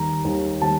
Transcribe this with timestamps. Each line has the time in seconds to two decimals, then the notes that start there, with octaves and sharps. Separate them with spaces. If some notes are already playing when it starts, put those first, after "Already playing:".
Already playing: D#2 D#3 G3 A#5
0.24 D#2 D#3 G3
0.62 D#3 G3 A5